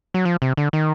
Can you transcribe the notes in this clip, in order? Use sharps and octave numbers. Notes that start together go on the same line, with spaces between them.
F#3
F3
C3
D3
D#3